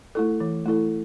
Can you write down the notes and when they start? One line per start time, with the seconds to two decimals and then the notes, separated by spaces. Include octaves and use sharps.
0.15 A3 E4 A4
0.40 E3
0.66 A3 E4 A4